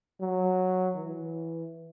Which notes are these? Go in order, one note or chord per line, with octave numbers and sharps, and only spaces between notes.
F#3
E3